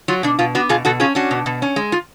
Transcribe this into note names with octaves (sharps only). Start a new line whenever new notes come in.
F#3 F4
B2 D4
B2 F4
B3 D4 F#4
B2 F4 G#4
B2 F#4 A4
C#4 F4 G#4
C#4 D4 F#4
B2
B2
C#4
G#3
F4